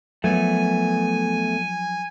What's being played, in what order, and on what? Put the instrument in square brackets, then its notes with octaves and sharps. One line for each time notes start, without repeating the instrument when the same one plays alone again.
[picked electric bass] F3 F#3 [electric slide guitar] A3 B3 [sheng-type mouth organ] G#5